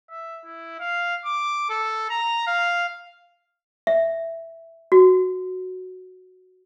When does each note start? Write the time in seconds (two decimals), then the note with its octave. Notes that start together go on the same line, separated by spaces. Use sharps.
0.10 E5
0.46 E4
0.80 F5
1.25 D6
1.70 A4
2.10 A#5
2.47 F5
3.87 E5
4.92 F#4